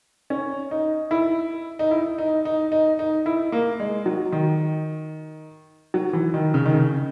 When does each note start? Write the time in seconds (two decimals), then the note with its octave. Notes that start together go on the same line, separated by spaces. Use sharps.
0.30 C#4
0.71 D#4
1.11 E4
1.79 D#4
1.91 E4
2.18 D#4
2.45 D#4
2.72 D#4
2.99 D#4
3.26 E4
3.52 A#3
3.80 G#3
4.06 F#3
4.32 D#3
5.94 F#3
6.13 E3
6.34 D#3
6.54 C#3
6.66 D#3
6.74 C#3